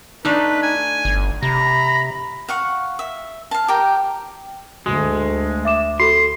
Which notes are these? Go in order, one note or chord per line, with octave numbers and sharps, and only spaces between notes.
A3 D4 D#4 B4
G#5
G1
C3 A#5 B5
F5 F#5 C#6
E5
F5 A5
G4 A#4 G5
D2 G#3 F#4
E5 D6 E7
F#4 A4 C6